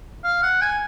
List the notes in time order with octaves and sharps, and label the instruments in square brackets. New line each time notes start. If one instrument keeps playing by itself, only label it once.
[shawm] F5
F#5
G#5